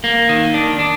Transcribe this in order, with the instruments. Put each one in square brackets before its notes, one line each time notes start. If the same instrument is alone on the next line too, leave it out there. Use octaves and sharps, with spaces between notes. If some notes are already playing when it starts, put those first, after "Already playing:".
[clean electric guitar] A#3
D#3
D4
D4